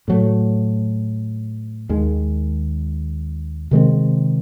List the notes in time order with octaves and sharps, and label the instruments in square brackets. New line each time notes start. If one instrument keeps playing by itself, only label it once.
[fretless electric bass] A2 F#3 A3
D#2 D#3 G#3
C3 D#3 G#3 C4